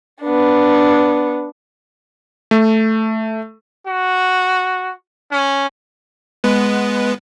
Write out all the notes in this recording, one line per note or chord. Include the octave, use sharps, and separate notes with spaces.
B3 D4
A3
F#4
C#4
G#3 B3 B4